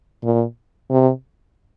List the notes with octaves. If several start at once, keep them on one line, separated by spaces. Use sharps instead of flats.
A#2
C3